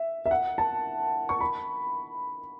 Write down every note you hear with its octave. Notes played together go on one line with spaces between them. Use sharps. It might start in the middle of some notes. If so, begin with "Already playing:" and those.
Already playing: E5
E5
F#5
A5
C#6
B5